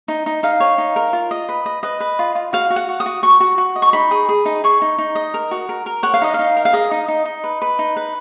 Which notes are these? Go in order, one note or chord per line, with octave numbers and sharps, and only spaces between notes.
D#4
D#4
D#4 F5
C#5
D#4
A#4
F4
D#5
B4
D#5
B4 D#5
B4
F4
F4
F#4 F5
F#4
F#5
F#4
D#6
F#4
F#4 C#6
F#4
F#4
D#5
C#6
D#4 B5
G#4
G#4
D#4
G#4 C#6
D#4
D#4
D#5
A#4
F#4
A#4
A#4
C#5 F#5
F5
D#4 D#5
F5
D#4
A#4
F5
G#4 D#5
D#4
D#4
D#4
B4
B4
D#4
B4